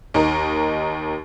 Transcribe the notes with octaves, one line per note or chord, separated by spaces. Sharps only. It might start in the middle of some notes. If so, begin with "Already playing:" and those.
D#2 D#4 A#4